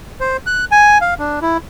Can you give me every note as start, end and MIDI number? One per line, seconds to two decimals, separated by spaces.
0.20 0.37 72
0.46 0.65 90
0.72 0.98 80
1.01 1.14 77
1.19 1.39 62
1.42 1.57 64